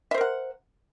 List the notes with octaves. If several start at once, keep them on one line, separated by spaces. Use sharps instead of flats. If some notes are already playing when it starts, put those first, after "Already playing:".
A#4 C5 E5 F#5